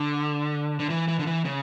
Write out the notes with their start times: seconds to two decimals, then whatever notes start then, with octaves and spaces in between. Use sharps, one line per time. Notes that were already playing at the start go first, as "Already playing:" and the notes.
Already playing: D3
0.80 D3
0.90 E3
1.08 E3
1.19 D3
1.27 E3
1.45 C#3